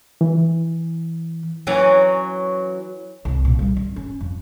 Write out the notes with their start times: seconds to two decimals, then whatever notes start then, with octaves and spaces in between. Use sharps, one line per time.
0.21 E3
1.67 E3 F#3 C#4
3.25 C2
3.45 A#2
3.59 G3
3.77 D4
3.96 C#4
4.21 F2